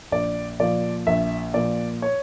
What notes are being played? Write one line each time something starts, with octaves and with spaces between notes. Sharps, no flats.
A#1 D5
A#2 F3 D5
A#1 E5
A#2 F3 D5
C#5